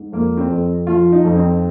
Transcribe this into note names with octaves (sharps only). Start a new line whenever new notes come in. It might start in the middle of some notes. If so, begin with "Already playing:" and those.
Already playing: G#2
F2 A#3
C4
F2
F3 F4
D#4
F2
C4